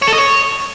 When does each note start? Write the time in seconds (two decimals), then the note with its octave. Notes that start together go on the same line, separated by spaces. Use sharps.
0.02 C#5
0.07 A4
0.13 D#5
0.18 C#5